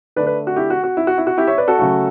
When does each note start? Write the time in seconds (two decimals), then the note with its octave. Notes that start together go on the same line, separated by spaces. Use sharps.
0.16 D3 A3 D4 B4 D5
0.26 B4 D5
0.47 F#4
0.56 E4 G4
0.70 F#4
0.84 F#4
0.97 E4
1.07 F#4
1.18 E4
1.27 F#4
1.38 E4 G4
1.47 C#5 E5
1.58 B4 D5
1.68 F#4 A4
1.78 C#3 F#3 A3